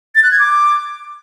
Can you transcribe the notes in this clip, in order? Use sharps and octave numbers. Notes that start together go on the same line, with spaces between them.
A6
F#6
G#6
D6